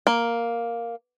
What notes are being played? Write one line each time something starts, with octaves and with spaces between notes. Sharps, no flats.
A#3